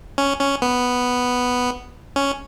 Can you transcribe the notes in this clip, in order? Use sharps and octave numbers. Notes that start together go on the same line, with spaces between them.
C#4
C#4
B3
C#4